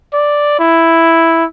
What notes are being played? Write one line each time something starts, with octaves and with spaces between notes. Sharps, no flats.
D5
E4